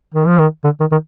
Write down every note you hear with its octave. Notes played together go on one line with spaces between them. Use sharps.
D#3
F3
D#3
D3
D#3
D#3